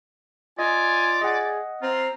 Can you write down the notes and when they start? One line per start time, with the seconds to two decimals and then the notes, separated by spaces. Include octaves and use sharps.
0.59 F4 D5 D#5 G#5
1.22 G#4 D#5 F#5
1.82 C4 F4 A#5